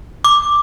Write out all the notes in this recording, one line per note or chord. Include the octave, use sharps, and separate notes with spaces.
D6